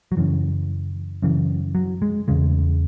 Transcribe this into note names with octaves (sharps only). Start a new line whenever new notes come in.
F#3
F#2 C#3 E3
F#2 C#3 E3
F#3
G#3
E2 C#3 G#3